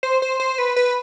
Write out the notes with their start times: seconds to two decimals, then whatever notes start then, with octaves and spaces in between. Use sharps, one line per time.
0.03 C5
0.22 C5
0.40 C5
0.58 B4
0.76 B4